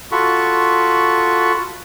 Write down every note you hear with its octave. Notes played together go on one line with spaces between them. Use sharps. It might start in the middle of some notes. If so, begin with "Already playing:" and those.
F4 F#4 A4 B5 C#6